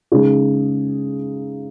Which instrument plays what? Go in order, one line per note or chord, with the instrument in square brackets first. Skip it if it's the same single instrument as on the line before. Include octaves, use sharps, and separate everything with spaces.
[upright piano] C#3 G#3 D#4 G#4